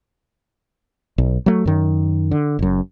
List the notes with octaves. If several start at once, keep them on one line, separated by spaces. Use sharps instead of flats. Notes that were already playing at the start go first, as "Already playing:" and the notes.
B1
F#3 A3
F#2 D#3
D3
F#1 F#2